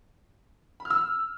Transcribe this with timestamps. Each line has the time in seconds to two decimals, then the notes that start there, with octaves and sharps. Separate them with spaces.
0.80 B5
0.85 F6
0.90 E6